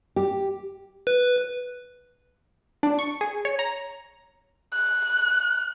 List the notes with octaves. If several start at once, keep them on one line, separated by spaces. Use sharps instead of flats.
G4
B4
D4
C#6
G#4
C#5
A#5
F#6